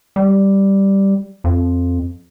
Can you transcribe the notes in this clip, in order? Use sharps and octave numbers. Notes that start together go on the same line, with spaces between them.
G3
F2